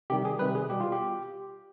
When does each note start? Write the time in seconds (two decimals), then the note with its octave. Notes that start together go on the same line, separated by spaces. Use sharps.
0.10 C3 D#3 G3 G4
0.25 G#4
0.39 C3 D#3 G3 B4
0.55 G#4
0.69 B2 G3 G4
0.80 F4
0.92 G4